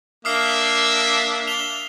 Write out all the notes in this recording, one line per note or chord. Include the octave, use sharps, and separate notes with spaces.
A#3 D4 E5 D#6 F6 C7
F7 G7